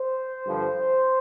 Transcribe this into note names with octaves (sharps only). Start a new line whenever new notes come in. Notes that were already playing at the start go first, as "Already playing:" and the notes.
Already playing: C5
G2 D3 F3